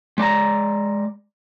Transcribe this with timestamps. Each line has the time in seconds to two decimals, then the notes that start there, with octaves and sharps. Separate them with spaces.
0.18 G#3 D5 G#5 A#5